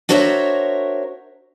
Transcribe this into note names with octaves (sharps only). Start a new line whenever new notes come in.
D4 F#4 A#4 C5 C#5 E5